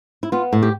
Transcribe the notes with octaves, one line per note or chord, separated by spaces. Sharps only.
E4
B3 F4
A2
G4